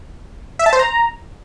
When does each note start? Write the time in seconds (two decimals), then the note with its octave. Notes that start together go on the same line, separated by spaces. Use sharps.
0.59 E5
0.66 A5
0.73 C5
0.79 A#5